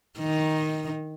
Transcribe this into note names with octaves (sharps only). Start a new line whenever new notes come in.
D#3